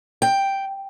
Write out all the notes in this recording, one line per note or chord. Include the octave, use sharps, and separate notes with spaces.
G5